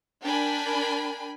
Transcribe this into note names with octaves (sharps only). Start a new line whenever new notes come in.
D4 A#4 G5 G#5 B5